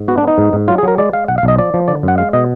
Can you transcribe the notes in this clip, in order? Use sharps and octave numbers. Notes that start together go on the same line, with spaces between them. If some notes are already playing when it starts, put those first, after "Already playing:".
Already playing: G#2
B3 F#4
D4
B3 D#4
G#2
G#2
F#3 F4
G#4
F#3 A#4
G#3 D5
G#3 F5
B1 F#5
F5
B1 D#5
F3 D5
F3
D3 D5
F#2 F#5
G#3 F5
B2 D#5